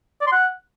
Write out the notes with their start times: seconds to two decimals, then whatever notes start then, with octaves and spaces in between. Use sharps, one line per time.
0.21 D5
0.27 C6
0.32 F#5